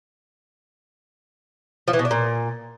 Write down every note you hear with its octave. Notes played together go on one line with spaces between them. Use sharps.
F3
E3
B2
D4
A#2